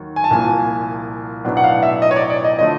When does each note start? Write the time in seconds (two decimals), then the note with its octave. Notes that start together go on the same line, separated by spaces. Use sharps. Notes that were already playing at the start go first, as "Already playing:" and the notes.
Already playing: D#2 D#3 F#3
0.16 G#5
0.24 A5
0.31 C2 A#2 F3 A#3 G#5
1.44 B1 A2 F#3 B3 D4
1.57 F#5
1.64 F5
1.83 E5
2.02 D#5
2.11 C#5
2.16 D5
2.30 D5
2.44 D#5
2.59 D3 F3 A3 D#5